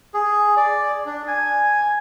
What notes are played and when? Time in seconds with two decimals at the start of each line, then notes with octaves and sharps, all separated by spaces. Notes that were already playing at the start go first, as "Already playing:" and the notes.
0.14 G#4
0.57 D5
1.06 D4
1.28 G#5